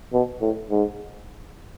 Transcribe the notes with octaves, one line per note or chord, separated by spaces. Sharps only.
B2
A2
G#2